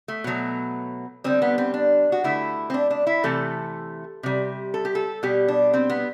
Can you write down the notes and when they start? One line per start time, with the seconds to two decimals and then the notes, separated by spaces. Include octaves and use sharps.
0.08 A3
0.24 B2 F#3 A3
1.24 D3 G3 C4
1.42 B3
1.58 C4
1.74 D4
2.12 F#4
2.24 D3 A3 E4
2.70 C4
2.74 D4
2.90 D4
3.07 E4
3.24 C3 E3 A3 A4
4.23 C3 G3
4.74 A4
4.85 G4
4.95 A4
5.23 B2 G3 G4
5.48 D4
5.74 C4
5.90 B3